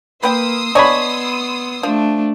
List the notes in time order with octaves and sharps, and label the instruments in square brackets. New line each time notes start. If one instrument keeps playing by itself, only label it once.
[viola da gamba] A#3 [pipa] B4 G5 B5 [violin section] C6 D#6 E6
[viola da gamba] B3 [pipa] D4 D#5 G#5 [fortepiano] C#5 B5
[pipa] F3 [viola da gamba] A3 D4